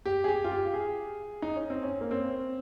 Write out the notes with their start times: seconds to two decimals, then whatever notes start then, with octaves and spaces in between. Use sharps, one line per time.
0.06 G4
0.24 G#4
0.28 G4
0.44 F4
0.52 G4
0.74 G#4
1.42 D#4
1.56 C#4
1.70 C4
1.83 C#4
2.01 A#3
2.11 C4